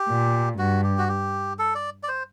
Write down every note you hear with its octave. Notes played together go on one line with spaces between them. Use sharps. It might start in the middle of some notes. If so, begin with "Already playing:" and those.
Already playing: G4
A#2
G2 F#4
G4
F#4
G4
A4
D5
D5
C5